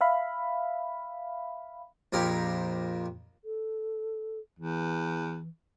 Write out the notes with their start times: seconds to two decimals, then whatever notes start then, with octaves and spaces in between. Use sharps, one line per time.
0.01 E5 F5 B5
2.13 A#1 F2 G4 A#4 C6
3.44 A4
4.59 E2 E3